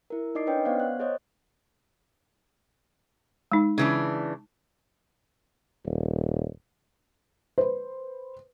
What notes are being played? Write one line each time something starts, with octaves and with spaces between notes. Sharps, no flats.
E4 A#4
D#4 D5 D#5 D6 C7
C#4 D4 B4 C#5 D#5 G5
B3 C5 D5 F5 F#5
F#6
G#4 C5 C#5 D#5
G#3 D#4
C#3 E3 D4
D#1
B4 C5